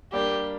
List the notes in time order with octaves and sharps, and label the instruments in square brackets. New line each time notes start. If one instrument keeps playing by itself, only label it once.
[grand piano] G3 A#3 D4 [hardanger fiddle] G4